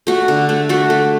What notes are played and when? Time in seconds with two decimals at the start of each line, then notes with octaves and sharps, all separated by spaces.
0.07 A3 F#4
0.28 D3
0.49 A3
0.69 A3 F#4
0.90 A3